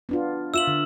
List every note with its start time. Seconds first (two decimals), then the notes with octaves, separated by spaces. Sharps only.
0.09 B3 D4 F4
0.54 F4 E5 E6 E7 F#7
0.67 D3